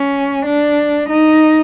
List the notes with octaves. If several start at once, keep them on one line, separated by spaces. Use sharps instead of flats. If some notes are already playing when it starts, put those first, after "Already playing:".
Already playing: C#4
D4
D#4